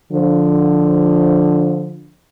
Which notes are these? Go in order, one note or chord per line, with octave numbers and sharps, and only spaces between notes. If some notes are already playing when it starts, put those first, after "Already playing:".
D3 F3